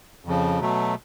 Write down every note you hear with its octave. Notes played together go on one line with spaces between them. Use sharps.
F2 C#3 F3
B2 F#3 A3